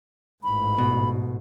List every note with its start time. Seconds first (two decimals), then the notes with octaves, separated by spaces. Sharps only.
0.44 A1 G#2 B5
0.78 B2